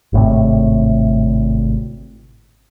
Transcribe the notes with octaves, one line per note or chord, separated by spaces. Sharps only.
G#1 A2 C3